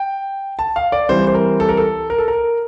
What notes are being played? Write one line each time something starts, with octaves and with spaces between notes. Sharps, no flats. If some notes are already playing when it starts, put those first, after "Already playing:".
Already playing: G5
A5
F5
D5
E3 G3 C4 C5
C5
A#4
A4
A#4
A4
A#4
A4
A#4